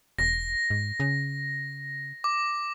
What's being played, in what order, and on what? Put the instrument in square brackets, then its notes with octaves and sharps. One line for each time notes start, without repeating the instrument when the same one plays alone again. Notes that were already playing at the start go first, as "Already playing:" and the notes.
[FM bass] E1 [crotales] A#6
[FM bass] G#2
C#3
[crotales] D6